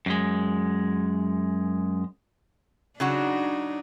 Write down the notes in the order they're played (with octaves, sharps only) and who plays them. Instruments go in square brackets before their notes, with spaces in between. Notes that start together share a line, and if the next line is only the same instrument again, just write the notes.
[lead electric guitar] F#2 G#3
[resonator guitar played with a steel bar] C#3 F#3 F#4 [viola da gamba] D4 D#4